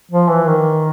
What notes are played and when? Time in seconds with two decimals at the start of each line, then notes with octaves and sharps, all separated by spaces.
0.11 F3
0.29 E3
0.48 D#3